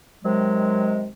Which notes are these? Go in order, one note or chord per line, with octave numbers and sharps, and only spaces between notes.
C3 D#3 F#3 G#3